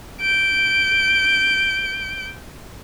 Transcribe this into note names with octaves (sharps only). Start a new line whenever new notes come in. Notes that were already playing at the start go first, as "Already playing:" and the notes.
G6 D7